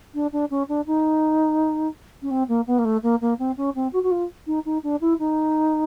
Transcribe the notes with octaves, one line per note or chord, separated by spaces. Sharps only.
D4
D4
C#4
D4
D#4
C#4
C4
A#3
B3
A#3
A3
A#3
A#3
C4
C#4
C4
F#4
F#4
F4
D#4
D#4
D4
E4
D#4